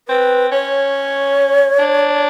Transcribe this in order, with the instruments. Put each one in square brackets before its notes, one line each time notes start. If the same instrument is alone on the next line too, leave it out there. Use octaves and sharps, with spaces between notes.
[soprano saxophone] C4 [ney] B4
[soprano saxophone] C#4 [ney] C#5
[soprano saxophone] D4